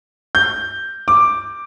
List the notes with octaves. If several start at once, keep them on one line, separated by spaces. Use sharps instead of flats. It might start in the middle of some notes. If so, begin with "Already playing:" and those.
G6
D6